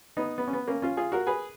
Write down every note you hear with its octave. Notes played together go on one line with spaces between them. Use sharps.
B3 D#4
B3
C#4
B3
A#3 C#4
C#4 F4
F4 G#4
F#4 A#4
G#4 B4